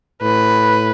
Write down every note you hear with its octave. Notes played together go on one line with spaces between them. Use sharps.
A2 B4